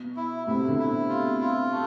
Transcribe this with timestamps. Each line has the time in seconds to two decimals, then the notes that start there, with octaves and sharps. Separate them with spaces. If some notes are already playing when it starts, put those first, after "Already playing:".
Already playing: B2
0.16 E4
0.47 A2 C3 E4
0.68 B2 D3
0.79 E4
1.09 F4
1.41 F4
1.71 A3